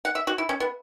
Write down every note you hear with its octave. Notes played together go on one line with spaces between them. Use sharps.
F#5
E5
F#4
E4
C#4
B3